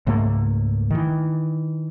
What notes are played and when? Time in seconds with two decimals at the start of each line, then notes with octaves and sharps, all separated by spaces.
0.07 C#2 G#2 A3 A#3
0.90 D#3 E3